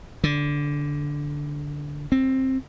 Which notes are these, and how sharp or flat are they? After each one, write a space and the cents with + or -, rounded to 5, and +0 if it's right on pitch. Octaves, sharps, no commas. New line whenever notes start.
D3 -10
C4 +10